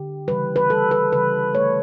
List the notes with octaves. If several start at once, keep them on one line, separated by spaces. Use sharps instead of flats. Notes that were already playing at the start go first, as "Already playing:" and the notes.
Already playing: D3 G4
C#3 E3 G3 B4
B4
D3 G3 A4
B4
C#3 E3 G3 B4
D3 A3 C#5